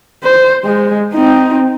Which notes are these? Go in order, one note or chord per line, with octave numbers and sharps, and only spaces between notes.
C5
G#3
C4 D#4